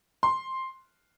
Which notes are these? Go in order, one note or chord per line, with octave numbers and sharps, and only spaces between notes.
C6